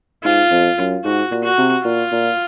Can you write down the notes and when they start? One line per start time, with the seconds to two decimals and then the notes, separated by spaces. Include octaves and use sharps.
0.24 G#2 F4
0.51 F2
0.78 F#2
1.04 G#2 F#4
1.31 A#2
1.44 F#4
1.58 C3
1.85 A#2 F4
2.12 A#2